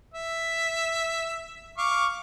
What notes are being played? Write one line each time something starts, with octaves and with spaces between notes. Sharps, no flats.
E5
F5 C#6 D6